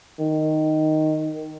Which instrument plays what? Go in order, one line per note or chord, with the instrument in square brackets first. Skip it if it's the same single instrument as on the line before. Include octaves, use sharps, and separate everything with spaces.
[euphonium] D#3